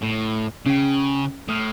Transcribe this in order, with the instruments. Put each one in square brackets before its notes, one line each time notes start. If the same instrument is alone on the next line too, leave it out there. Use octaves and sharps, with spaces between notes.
[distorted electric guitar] A2
[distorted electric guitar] C#3 [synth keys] C#4 G5
[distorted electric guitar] A2 [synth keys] D#6 F6 D#7